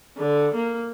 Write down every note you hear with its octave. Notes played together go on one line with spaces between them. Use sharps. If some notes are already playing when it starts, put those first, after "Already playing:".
D3
A#3